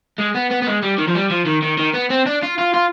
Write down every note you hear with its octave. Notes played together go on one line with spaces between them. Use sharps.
G#3
B3
B3
B3
G#3
G3
D#3
F3
G3
F3
D#3
D#3
D#3
B3
C4
D4
F4
F4
F4